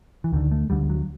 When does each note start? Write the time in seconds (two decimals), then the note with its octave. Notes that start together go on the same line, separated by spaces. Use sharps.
0.24 E3
0.33 D2 D3 D#3
0.51 A3
0.70 D2 D3 G3
0.89 F#3